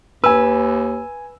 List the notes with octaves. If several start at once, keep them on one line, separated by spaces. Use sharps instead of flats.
D#2 B4 G#5 E6